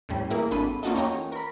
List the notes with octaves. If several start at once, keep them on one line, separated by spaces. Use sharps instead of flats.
E2 A2 G3 C#4
A#3 E4 G#4 A#4
G#1 D4 A4 B5 D#7
A#3 C#4 F4 F#4 A4 D#5
E2 C#4 D#4 C#5 G5 A#5
A#4 B5